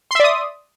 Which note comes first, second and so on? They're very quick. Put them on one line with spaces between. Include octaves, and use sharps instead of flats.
C6 E5 D5 D#6